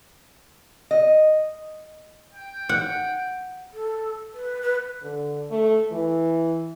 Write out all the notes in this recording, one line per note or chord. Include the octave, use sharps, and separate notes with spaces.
D#5
G5
F#5
A4
B4
B4
D3
A3
E3